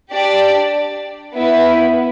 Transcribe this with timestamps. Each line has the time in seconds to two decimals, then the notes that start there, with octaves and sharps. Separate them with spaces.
0.12 D4 G4 D5
1.34 B3 E4 B4